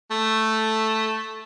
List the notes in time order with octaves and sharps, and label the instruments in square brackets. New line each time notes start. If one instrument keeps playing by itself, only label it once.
[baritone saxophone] A3